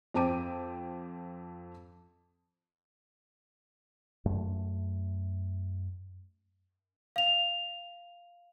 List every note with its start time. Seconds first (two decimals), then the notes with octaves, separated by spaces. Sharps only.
0.14 F2 C4 G5 A5 D6 D#7
4.25 F#2 A3
7.16 F5 F7